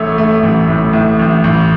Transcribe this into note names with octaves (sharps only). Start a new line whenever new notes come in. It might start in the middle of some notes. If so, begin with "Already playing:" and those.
Already playing: A1 A3 C#5
A3
A1
A2
A2
A1
A1